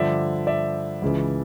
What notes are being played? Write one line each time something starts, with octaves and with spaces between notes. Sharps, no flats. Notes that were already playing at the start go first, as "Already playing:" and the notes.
Already playing: G2 D3 F3 D5 E5
D5 E5
C#2 C#3 E3